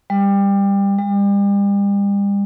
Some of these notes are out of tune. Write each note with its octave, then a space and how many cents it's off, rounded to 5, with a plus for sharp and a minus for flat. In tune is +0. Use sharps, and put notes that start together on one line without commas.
G3 +20
G3 +40